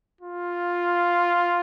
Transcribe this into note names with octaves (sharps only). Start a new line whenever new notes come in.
F4